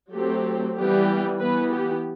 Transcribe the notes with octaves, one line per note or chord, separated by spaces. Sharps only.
F#3 A3 C4 G4
E3 G3 B3 G4
E3 B3 B4
G4